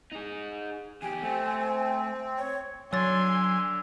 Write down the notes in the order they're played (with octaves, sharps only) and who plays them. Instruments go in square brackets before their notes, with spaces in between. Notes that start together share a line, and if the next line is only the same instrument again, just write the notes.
[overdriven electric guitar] D#4 G#4
[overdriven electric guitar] E2 G4 [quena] G#5
[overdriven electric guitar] A3 [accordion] C4
[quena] C#5
[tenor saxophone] D3 [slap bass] F#3 [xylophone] C#5 A6 [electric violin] G#5 C6